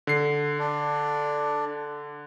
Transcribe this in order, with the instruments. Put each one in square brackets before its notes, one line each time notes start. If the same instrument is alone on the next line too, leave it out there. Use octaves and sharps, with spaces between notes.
[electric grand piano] D3 C7
[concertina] D4